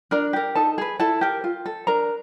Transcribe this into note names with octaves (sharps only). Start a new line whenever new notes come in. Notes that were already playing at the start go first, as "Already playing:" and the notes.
D4 A#4 A#5
G4 A#4
D#4 A4 A5
G#4 B4
E4 A4 A5
G4 A#4
F4
A4
D4 A#4 A#5